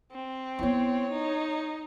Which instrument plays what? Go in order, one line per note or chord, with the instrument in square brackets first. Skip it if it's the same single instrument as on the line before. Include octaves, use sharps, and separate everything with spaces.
[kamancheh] C4
[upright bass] B3 E4 [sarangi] C#5
[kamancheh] D#4